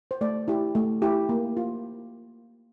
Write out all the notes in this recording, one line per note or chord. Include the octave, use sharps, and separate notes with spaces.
C5
A3 D5
E4 G4
A3
E4 G4
A#3
F4